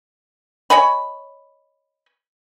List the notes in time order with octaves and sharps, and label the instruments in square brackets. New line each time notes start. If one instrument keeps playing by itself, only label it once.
[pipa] C#5 D#5 G#5 B5